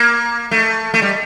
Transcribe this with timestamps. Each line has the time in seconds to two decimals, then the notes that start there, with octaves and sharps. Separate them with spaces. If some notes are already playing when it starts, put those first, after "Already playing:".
Already playing: A#3
0.51 A3
0.94 A3
1.02 G3